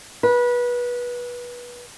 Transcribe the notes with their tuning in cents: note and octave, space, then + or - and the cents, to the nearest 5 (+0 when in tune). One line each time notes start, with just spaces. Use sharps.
B4 -25